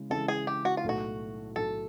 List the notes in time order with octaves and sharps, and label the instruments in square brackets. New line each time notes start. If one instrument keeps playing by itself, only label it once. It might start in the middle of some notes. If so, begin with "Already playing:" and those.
Already playing: [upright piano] C#3 E3 G#3
[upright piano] C#3 E3 G#3 [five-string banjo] A4
[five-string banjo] G#4
G4
F#4
F4
[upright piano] B1 A2 F#3 A3 [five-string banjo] F#4
[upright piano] B1 A2 F#3 A3 [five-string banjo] A4